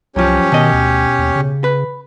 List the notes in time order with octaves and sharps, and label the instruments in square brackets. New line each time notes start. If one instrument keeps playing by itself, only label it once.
[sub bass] C2 [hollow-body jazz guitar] F#2 F3 [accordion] C#4 G4 C#5
[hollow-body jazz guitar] B2 D#5 [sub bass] D#3
[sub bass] D2
D#2
C#3
[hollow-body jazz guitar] B4